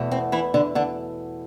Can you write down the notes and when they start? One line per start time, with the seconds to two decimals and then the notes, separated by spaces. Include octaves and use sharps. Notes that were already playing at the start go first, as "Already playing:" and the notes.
Already playing: E2 B2 A3
0.11 C4
0.32 E3 E4
0.54 D3 D4
0.75 D3 D4